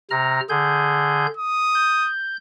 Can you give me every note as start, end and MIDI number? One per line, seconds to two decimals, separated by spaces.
0.11 0.41 48
0.11 0.41 82
0.11 0.41 89
0.50 1.27 50
0.50 1.27 68
0.50 1.27 91
1.37 2.10 87
1.75 2.37 91